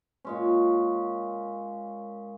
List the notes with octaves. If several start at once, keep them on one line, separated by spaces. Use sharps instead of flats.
A#2 G#3 C#4